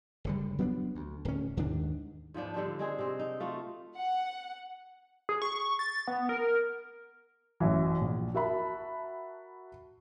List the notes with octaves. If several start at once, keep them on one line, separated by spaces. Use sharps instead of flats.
F#1 D3 G3
F#3 B3 C#4 D4
D2
D1 C#4
D#2 G#2 D#3 D4
G#2 F3 B3 D4
D3 G3 C4 D4
G#3 C4 G#4
C3 C4
D#4
A3 F4 F#4
F#5
G#4
C#6
A6
B3
A#4
A1 F#2 E3
A#1
F#4 A#4 E5 A5 B5